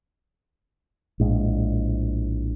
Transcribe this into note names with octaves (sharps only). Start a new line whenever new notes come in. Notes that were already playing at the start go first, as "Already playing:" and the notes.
A#1 A2 G#3